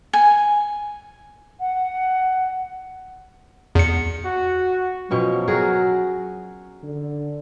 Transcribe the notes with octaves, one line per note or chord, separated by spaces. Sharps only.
G#5
F#5
E2 C#7
F#4
B2 F3 F#3 C#4
F#4 G#4 A#4
D3